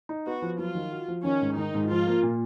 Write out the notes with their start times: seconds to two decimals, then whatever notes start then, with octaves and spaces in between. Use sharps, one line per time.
0.09 D#4
0.26 B3 F#4
0.42 F3
0.58 F#3 F4
0.75 D#3
0.92 F#4
1.08 F3
1.25 D#3 C#4
1.42 G#2
1.57 D#3 D#4
1.74 G#2
1.90 F3 F4
2.07 A#3
2.23 A#2